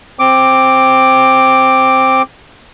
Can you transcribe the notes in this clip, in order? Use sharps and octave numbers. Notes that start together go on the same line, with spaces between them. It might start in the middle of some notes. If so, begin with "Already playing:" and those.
C4 D6